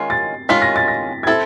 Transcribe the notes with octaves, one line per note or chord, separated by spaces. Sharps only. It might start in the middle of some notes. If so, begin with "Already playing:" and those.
Already playing: D#3 G#3 C#4 F4 C7
A6
D#3 G#3 C#4 F4 B6
A#6
A6
A#6
G#6
C4 E4 A4 A6